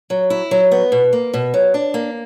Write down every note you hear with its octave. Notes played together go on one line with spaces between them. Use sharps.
F#3
E4
F#3
B3
B2
A#3
B2
F#3
D4
A#3